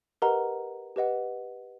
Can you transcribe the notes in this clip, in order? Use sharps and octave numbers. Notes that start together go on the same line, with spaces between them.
G4 A#4 B4 D#5 F#5 A#5
G4 B4 D#5 F#5